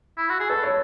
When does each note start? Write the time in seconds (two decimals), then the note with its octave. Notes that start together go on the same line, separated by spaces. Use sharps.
0.18 E4
0.29 F#4
0.40 G#4
0.50 A4 B4
0.63 C#5